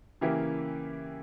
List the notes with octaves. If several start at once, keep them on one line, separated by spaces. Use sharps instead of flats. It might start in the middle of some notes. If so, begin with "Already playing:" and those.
C#3 E3 A#3 E4 G4